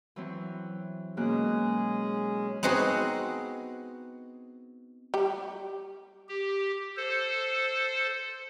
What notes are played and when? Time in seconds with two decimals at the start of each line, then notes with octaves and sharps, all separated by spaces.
0.16 E3 F#3 C4
1.17 B2 G#3 A#3 C#4 G#4 F#6
2.63 B3 C4 D#4 F#4 G#4
5.14 G3 G4
6.29 G4
6.97 A4 C5